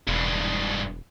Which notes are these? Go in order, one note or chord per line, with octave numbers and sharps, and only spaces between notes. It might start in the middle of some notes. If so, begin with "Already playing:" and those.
E1 G2 G#3